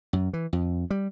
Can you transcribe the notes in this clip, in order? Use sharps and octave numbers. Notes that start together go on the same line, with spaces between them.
F#2
E3
F2
G3